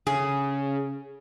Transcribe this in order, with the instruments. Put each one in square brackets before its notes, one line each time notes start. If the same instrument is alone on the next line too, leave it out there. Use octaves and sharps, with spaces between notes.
[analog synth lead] C#3 [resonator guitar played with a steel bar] G#4